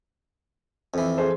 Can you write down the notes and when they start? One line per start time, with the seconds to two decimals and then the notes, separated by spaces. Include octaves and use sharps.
0.94 F2 E3
1.18 G#4 A4 C5